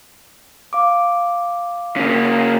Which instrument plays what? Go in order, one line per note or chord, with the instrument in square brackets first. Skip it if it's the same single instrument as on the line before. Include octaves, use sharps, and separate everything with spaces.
[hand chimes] F5 D6
[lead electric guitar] C#3 A#3